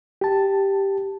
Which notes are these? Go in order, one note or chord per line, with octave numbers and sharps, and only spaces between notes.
G4 A5